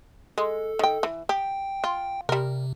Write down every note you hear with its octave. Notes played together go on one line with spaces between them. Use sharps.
G#3 A4
D#3 G5
E3
G4 G5
F4
C3 G3 A#4